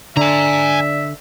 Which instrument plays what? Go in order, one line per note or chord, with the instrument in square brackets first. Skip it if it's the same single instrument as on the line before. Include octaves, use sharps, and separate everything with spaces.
[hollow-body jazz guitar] D3 [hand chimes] D5 [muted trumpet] E5 [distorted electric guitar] G#5 A#5